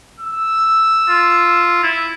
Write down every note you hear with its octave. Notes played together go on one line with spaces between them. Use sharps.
E6
F4
E4